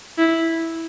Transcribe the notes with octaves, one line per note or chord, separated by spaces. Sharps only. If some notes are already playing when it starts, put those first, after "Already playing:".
E4